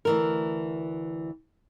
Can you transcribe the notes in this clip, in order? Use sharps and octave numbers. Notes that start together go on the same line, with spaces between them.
D2 E3 A#4